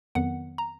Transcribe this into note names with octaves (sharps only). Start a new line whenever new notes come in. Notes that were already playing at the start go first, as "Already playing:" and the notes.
F2 D#3 F#3 B3 F#5
A#5